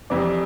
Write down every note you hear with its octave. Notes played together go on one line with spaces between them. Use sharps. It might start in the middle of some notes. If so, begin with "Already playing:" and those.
F2 C3 E3 D5